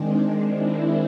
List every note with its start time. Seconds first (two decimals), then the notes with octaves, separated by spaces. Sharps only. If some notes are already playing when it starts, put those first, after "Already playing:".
Already playing: D#3 G#3 C4 D4
0.50 D4 E4